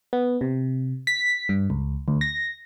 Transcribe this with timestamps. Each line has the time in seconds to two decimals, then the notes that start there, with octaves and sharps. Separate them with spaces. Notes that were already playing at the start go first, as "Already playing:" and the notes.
0.13 B3
0.41 C3
1.07 B6
1.49 G2
1.70 C#2
2.08 D2
2.21 A#6